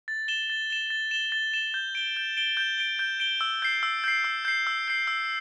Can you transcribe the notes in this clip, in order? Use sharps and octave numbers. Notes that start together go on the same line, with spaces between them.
A6
E7 G7
A6
E7 G7
A6
E7 G7
A6
E7 G7
G6
D7 G7
G6
D7 G7
G6
D7 G7
G6
D7 G7
E6
G6 C7
E6
G6 C7
E6
G6 C7
E6
G6 C7
E6